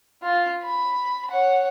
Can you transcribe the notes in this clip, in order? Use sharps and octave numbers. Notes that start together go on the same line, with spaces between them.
F4
B5
C#5 F#5